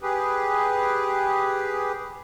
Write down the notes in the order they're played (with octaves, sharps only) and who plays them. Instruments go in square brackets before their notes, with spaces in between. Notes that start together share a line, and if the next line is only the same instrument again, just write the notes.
[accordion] G4 G#4 B4